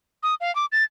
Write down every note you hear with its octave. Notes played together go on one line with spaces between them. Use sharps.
D#6
F5
D6
A6